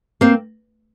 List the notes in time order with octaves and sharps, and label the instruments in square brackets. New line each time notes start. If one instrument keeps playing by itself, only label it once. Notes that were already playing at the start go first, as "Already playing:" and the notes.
[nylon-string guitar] A#3 C4